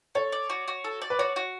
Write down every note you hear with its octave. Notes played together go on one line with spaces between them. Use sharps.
A4 C#5
D5
F#4
F#4
A4
D5
B4
F#4 C#5
F#4